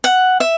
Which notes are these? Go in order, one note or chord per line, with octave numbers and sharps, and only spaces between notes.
F#5
E5